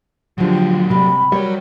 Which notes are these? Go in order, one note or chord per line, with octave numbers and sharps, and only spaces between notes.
D3 F3 F#3 G#3 G4
C3 G3 B5
G3 F#4 A#4 C#5